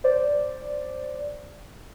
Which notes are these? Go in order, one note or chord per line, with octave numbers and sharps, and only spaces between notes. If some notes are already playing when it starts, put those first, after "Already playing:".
C5 D5